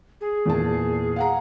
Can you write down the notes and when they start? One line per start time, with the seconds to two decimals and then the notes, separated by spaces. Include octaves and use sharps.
0.21 G#4
0.46 E2 A#2 A5
1.16 F5 F#5 A#5